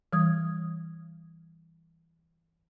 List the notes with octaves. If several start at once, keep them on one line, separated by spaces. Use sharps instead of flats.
E3 G3 D#6 G#6